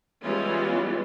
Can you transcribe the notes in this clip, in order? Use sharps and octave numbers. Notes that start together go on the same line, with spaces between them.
E3 G3 G#3 B3 C#4 F4